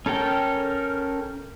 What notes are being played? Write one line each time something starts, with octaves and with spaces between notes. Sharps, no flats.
C#4 A4 A#4 G5